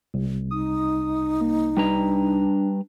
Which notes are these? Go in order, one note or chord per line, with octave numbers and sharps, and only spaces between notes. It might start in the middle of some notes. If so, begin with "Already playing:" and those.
C2
D#4 D#6
A#3
G3 D4 B4 A#5